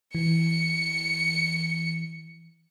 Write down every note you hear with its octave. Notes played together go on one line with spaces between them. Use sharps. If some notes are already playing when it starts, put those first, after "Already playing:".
E3 C#7